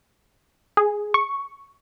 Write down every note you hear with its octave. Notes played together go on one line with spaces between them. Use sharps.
G#4
C#6